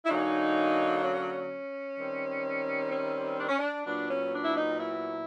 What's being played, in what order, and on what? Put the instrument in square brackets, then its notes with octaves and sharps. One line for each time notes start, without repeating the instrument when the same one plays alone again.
[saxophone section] E4
D3 F#3 A#3 C#4 D#4
C#4
D#3 G3 C4
C#4
D4
C#4
D4
A#2 F#3 B3 D4
C#4
D4
E4
D#4
E4